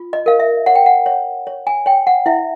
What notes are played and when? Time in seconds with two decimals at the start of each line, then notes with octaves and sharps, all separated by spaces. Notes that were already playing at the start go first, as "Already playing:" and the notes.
Already playing: F4
0.13 D#5
0.26 A#4 F5
0.39 E5
0.66 C#5 F#5
0.75 G5
0.86 F#5
1.06 C#5
1.47 C#5
1.67 G#5
1.86 C#5 G5
2.07 F#5
2.26 E4 E5